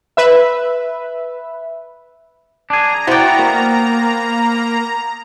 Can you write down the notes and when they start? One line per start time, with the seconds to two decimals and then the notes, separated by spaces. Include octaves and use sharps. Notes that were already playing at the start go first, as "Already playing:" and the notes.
0.17 B4 E5
2.70 D4 G#4 A#5
3.07 B3 E4 F#4 C5 D5 G5
3.39 A#3